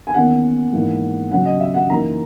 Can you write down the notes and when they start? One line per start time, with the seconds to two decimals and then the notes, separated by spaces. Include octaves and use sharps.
0.07 G#5
0.14 E2 D#3 A#3 C#4 F#5
0.73 G#2 E3 A#3 D#4
1.31 C#3 F#3 C#4 F#5
1.45 D#5
1.60 E5
1.74 F#5
1.89 F#2 E3 A#3 D#4 A#5